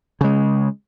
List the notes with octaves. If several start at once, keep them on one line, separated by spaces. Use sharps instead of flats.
C#3 G#3